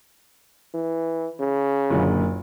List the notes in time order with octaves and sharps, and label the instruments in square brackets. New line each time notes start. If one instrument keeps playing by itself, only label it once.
[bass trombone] E3
C#3
[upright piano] F#1 A#2 D3